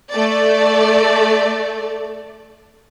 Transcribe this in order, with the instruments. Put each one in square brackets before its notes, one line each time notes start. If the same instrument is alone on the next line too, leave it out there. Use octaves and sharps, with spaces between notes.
[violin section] A3 D5